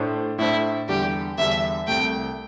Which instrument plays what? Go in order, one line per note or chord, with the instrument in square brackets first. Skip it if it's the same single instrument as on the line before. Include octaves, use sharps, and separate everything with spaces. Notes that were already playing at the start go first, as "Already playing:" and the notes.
Already playing: [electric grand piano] A2 A3 D4 C5
[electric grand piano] A2 A3 D4 C5 [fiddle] E4
[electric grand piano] E2 D3 G3 D4 [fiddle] G4
[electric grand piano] E2 D3 G3 D4 [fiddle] E5
[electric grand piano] C2 C3 A3 [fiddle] G5